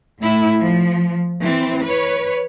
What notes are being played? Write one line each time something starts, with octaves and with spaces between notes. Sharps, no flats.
A2 E4
F3
E3 C4
B4 C#5